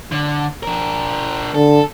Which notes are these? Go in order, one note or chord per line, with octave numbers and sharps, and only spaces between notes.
D3
D4 A#4
D3 A4